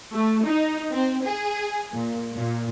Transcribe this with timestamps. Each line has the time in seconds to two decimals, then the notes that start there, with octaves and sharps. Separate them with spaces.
0.13 A3
0.45 D#4
0.92 C4
1.24 G#4
1.94 A#2
2.36 A#2